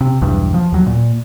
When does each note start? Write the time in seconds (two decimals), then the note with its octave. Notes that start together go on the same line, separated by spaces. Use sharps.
0.01 C3
0.21 B1 E2 G2
0.54 F3
0.72 D#2 F#3
0.86 A#2